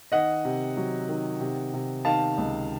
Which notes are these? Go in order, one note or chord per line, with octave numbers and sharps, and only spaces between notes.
D#3 D#5 F#5
C3
F#3
D#3
C3
C3
D#3 F5 A5
C#2